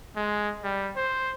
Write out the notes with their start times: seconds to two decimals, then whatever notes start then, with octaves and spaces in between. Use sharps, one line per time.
0.16 G#3
0.63 G3
0.96 C5